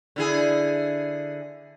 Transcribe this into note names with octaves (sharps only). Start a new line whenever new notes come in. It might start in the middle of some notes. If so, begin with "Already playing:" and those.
D3 E4 G#4